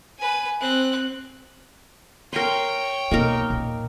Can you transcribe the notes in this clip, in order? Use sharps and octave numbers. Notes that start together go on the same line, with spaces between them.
B4 G#5
C4 F#6
A#4 C#5 G5 C6
C2 B2 A#3 D#4 A#4
A#1 E2